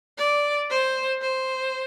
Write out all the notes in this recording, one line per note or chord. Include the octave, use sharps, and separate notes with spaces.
D5
C5
C5